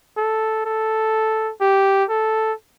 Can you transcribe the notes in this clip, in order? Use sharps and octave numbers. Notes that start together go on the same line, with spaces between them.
A4
A4
G4
A4